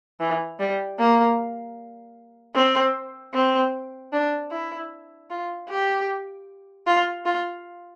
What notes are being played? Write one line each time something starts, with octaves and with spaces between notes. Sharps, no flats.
E3
G3
A#3
C4
C4
D4
E4
F4
G4
F4
F4